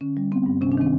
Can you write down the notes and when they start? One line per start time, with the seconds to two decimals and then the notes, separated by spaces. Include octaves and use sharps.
0.01 D3 C#4
0.17 G3
0.32 B3 C4
0.46 G2
0.61 C3 C#4
0.72 D4
0.77 D#3 C4